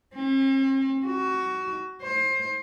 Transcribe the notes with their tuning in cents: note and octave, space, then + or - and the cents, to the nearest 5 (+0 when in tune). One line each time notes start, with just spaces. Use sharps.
C4 +45
F#4 +15
C5 +25